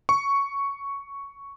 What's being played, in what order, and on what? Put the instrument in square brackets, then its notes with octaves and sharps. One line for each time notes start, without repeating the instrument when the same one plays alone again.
[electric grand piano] C#6